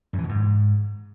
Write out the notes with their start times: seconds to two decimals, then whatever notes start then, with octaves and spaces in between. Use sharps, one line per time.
0.13 F#2
0.18 E3
0.24 B2
0.29 G#2